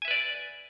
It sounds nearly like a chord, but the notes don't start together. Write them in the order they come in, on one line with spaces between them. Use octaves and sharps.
G#5 E5 B4 D5